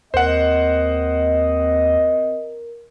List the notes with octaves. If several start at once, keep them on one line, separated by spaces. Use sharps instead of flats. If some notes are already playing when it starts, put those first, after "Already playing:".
D#2 C4 A#4 C5 D#5 F#5